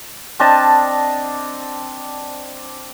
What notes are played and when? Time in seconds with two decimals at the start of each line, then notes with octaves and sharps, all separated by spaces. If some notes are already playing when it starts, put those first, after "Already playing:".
0.39 C4 D4 D#5 A5